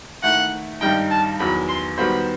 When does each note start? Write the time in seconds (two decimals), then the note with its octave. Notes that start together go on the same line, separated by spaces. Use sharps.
0.23 D#3 A3 E4 F#5
0.81 G2 D#3 G3 D#4 G5
1.11 A5
1.39 E2 D#3 F#3 B5
1.69 C6
1.98 D#3 G3 B3 F#4 C5 B5